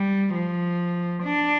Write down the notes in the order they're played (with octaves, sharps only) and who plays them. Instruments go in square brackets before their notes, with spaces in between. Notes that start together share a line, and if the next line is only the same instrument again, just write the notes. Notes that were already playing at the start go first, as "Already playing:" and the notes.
Already playing: [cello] G3
F3
D4